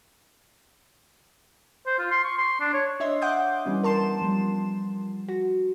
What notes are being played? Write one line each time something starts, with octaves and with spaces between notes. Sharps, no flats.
C5
F4
C6
C#6
C6
D4
C#5
D4 C#5 D#5 E5 C6
F#5 D6 D#6 G6
E3 G3 B3 C#4
A#4 A5 C6 E7
F3 G3
F#4